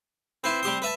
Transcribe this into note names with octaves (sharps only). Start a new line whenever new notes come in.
C4 E4 B4
G3 G4 C6
B4 E5 A5